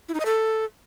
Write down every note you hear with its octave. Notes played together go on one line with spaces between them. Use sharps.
E4
D#4
D#5
A4